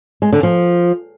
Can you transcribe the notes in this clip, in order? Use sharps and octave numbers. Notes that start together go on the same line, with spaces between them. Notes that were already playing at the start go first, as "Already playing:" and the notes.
G#3
D3
F3